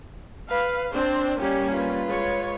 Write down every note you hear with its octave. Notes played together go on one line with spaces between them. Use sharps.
B4 F5
C4 D4 C5
G3 A#3 C#4 G4
F4 B4
G#3 C#5